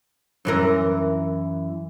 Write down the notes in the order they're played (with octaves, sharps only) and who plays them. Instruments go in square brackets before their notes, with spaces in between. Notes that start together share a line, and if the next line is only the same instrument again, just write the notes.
[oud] F#2 E3 A#4